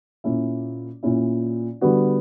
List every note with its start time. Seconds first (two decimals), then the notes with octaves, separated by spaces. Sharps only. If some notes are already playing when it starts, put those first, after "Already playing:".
0.24 A#2 A#3 C#4 E4
1.03 A#2 A#3 C#4 E4
1.81 D3 G3 B3 F#4